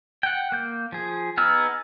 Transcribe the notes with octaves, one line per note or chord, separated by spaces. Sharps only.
F#5 G5
A#3 G6
F3 G#4
B3 D#4 G#4 E6 F6